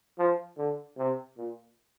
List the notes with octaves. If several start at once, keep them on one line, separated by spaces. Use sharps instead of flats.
F3
D3
C3
A#2